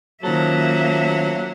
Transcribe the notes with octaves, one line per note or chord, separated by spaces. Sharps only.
D#3 F#3 A#3 C#4 F4 A4 C5 E5